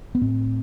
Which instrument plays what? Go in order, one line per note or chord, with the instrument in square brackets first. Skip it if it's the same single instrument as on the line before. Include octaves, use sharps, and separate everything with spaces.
[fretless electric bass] B3
A2 C4